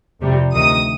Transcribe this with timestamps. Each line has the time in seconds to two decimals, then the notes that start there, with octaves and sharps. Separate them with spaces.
0.21 F2 C3 G3
0.53 D2 C3 D#3 D#6